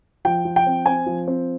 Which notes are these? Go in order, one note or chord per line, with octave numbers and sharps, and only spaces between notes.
F3 G5
F3
G5
C4
C4 G#5
F3
C4